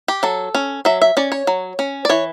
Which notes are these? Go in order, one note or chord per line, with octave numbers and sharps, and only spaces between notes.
G4
F#3 A4
C#4
F#3 E5
E5
C#4 D5
C#5
F#3
C#4
D5
E3 C#5